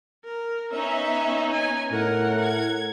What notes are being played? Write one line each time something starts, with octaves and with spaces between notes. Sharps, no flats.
A#4
B3 C#4 D#4 E5
G#5
A2 A#4 F#5
G#6